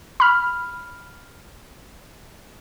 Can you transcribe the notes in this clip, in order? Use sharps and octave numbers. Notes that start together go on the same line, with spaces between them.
B5 F6